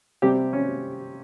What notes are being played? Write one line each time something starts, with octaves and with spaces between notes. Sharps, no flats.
C3 G3 C4 G4
C#4